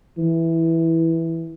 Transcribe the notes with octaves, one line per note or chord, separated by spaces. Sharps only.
E3